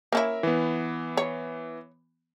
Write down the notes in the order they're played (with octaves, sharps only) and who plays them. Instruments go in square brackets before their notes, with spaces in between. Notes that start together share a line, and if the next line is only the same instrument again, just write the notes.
[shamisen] A#3 C#4 E4 [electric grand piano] A#4 E5
[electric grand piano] E3 B3
[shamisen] C#5